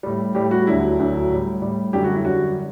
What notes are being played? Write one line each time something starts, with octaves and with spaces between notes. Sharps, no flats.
A2 G3
A2 G3 G4
F#4
D2 D3 F#3 E4
D2 D3 F#3
A2 G3
A2 G3
F#2 D3 G3 G4
F#4
E4
F#2 D3 G3 F#4